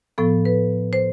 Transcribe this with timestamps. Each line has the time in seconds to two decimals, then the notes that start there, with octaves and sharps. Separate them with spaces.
0.18 A2 F3 B3 A4
0.45 B4
0.93 C5